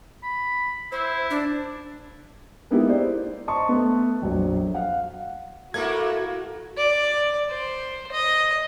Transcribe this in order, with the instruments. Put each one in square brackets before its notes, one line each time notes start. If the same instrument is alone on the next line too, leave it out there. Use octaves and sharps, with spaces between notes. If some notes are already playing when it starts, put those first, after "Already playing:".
[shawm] B5
[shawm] E4 [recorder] C5
[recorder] D4
[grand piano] G#3 A#3 B3 D#4 E4 G4
C5 D5
D#5 A5 C6 C#6
A3 B3
A#1 F2 F#3
F5 F#5
[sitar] A3 A#3 E4 [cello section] F#4 [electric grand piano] G#6
[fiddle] D5
C5
D#5